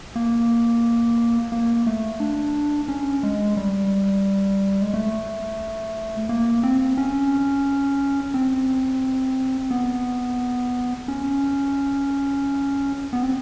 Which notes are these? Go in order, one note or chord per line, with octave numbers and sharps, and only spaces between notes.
A#3
A#3
A3
D4
C#4
G#3
G3
G#3
A3
A#3
C4
C#4
C4
B3
C#4
B3
C4